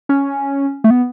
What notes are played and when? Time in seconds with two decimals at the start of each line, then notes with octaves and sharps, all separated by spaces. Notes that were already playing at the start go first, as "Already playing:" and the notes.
0.09 C#4
0.84 A3
0.90 B3